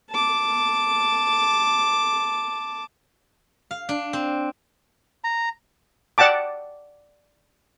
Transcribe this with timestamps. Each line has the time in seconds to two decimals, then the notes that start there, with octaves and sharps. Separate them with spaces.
0.10 A5 D6
3.71 F5
3.89 D4
4.13 C4
5.24 A#5
6.18 D5 F#5 G5 A5 D6